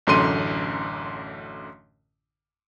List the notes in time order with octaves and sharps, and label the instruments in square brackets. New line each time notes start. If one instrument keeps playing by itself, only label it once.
[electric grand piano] A1 F#2 D3 C6 D#7